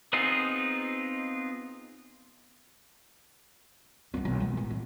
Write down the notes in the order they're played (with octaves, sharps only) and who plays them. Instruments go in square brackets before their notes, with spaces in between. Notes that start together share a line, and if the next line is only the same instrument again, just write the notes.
[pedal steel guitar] B3 C4 D#4 F4 G#4
[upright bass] A#3 B3
B1 B3
G#3 D#4
A1
A2